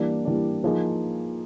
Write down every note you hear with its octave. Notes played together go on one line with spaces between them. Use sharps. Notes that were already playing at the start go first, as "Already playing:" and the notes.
Already playing: E3 G3 A#3 D4
E3 G3 A#3 D4
F3 A#3 D#4 G#4